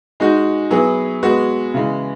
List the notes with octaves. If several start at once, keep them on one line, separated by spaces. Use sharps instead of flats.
G#3 D#4 F#4
F#3 B3 E4 G#4
G#3 B3 F#4
C#3 E3 G#3